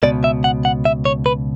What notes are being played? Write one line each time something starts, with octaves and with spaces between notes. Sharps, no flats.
C#2 B2 D5
E5
F#5
F#5
E5
C#5
B4